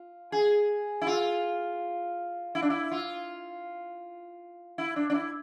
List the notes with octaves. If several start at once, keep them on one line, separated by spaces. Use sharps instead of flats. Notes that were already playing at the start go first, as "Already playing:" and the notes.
Already playing: F4
G#4
E4
F4
E4
D4
E4
F4
E4
D4
D4
E4